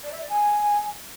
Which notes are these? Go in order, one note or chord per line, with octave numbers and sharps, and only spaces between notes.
D5
E5
D5
G#5